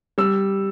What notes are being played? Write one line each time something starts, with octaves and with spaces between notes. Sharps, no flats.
G3 E6